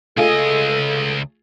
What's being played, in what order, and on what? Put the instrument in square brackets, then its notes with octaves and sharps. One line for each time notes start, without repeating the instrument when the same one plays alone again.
[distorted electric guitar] C#2 D#5 [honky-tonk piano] A3 F4 G#4 [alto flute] A4